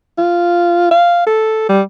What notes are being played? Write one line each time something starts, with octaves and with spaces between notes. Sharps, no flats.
F4
F5
A4
G3